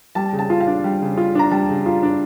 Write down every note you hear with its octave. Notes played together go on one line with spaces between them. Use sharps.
G3 A5
C#3
A5
F4
F5
D4
G3
C#3
F4
D4 A#5
G3 A5
C#3
F4
D4